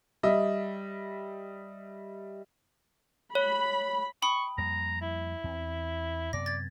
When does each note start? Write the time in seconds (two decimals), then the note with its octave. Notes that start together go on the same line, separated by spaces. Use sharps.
0.23 G3 D#5 E5
3.35 C#5 B5
4.22 G5 B5 C#6 D#6
4.58 F2 G3 A#3 A#5
5.01 E4
5.44 E2 C4
6.33 F#2 C3 B3 D5 A#6
6.46 G#6 A6